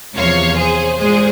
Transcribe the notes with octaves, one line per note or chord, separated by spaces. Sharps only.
E2 C3 F3 C#5 F5
G#4 C5
A#2 G#3 G#4 C5